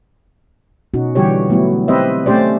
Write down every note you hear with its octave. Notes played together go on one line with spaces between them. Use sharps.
B2 C#4 D#4 F#4
D3 E3 G3 F#4 G4 C#5
F#3 A3 B3 E4
C4 G4 B4 C5 D#5 E5
A3 C4 C#4 G4 C5 D5